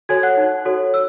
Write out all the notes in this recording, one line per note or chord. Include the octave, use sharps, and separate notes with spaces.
F#4 A4 C#5 G#5 G#6
F#5 F#6
D#4
F#4 A4 C#5
E6